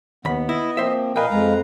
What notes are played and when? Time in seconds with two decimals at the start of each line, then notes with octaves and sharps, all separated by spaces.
0.25 D#2 B3 B5
0.49 E4 D#5
0.77 F3 A#3 C4 C5 E5
1.16 A#2 A#4 B4 D#5 F5 G5 G#5
1.30 F2 G#3 A#5